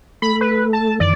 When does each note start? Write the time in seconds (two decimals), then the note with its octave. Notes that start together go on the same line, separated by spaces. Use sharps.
0.22 A3 A4 B5
0.41 B4
0.73 A5
1.00 F#2 D#3 E3 D5